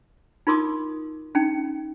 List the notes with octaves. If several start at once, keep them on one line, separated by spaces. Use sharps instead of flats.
D#4 F4 A#4 C6 D6 D#6
C#4 D#4 G5